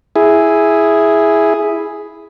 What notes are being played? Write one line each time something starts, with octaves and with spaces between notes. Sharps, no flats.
E4 G#4